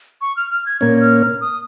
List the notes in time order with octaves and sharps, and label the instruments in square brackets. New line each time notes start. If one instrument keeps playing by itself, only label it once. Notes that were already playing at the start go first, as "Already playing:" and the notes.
[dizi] C#6
F6
F6
G#6
[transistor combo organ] A#2 A#3 C#4 [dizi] G#6
[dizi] F6
F6
D#6